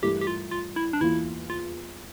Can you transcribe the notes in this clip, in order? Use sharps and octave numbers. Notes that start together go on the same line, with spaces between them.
G2 E3 A3 E4 G4 A#4
G4
F4
F4
E4
D4
E2 E3 A#3 E4 F4
F4